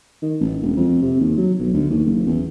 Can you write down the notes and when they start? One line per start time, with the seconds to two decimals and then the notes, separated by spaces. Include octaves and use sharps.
0.23 D#3
0.41 A1
0.61 E1
0.77 F2
1.02 C3
1.20 D#2
1.38 F#3
1.59 B1
1.73 D2
1.90 D#2
2.05 F#1
2.27 E2